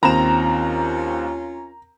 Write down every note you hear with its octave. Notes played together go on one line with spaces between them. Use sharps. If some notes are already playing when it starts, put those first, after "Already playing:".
D#2 C4 C#4 F4 A#5 E7